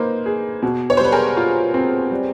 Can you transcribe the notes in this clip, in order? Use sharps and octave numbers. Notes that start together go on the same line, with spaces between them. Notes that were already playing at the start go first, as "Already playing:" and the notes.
Already playing: A#3 D#4 B4 C5
G#4
B2
C#5
C5
G3 B4
G#4 A#4
F4
C4
G3